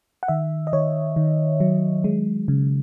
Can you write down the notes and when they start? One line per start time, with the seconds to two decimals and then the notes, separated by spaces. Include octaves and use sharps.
0.23 F#5
0.28 D#3 E5
0.67 D#5
0.73 D#3 C#5
1.16 D#3
1.60 F#3
2.04 G#3
2.48 C#3